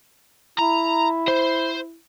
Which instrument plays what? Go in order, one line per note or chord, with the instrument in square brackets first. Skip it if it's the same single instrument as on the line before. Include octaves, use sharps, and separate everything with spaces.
[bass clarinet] E4 [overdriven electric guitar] A#5
[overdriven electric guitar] C5